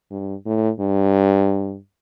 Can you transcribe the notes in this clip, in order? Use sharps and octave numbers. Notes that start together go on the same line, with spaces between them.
G2
A2
G2